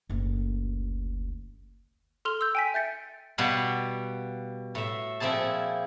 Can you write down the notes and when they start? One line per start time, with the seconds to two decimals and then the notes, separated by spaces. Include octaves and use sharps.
0.09 F#1 D2
2.25 A4 C6 F6 F7 G7
2.41 E6 G6
2.55 G5 G#5 B6
2.74 E5 G6 A6 C#7
3.38 B2 G3 F5 F#5 B5
4.75 A2 E5
5.20 A#2 F3 C4 E4 G#4 A5